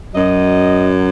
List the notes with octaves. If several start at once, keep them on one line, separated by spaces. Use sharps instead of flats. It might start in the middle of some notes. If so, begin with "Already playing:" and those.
F#2 F#3 D#5